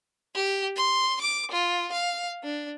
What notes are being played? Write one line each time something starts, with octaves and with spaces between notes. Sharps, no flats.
G4
C6
D6
F4
F5
D4